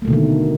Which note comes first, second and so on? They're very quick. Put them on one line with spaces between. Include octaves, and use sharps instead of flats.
A#3 A3 B2 D3 D#3